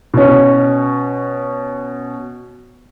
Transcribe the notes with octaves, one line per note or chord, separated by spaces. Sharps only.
B2 C#4